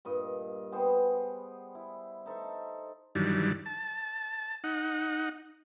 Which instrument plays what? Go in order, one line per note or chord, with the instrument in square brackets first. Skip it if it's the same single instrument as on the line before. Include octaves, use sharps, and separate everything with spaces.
[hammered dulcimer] G2 A#2 D#5
G3 B3 G#4 C5
E4
D#4 A4 C5 E5
[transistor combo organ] G2 D#3 E3 F#3 G3 D4
A5
D#4 F#5